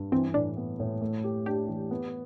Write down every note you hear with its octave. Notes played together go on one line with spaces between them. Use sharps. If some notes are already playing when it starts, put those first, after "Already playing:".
Already playing: G2
E3 C4
A2 D4
B3
A2
A3
G4
D4 G4
E3
B3